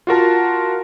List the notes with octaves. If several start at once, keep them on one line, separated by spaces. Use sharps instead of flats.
F4 F#4 A#4 A5